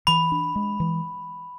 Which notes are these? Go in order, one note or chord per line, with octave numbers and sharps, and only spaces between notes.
E3 B5
D4
G#3
E3